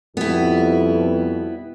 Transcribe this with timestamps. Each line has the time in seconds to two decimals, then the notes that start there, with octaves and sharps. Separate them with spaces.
0.17 F2 B2 G3 B3 E4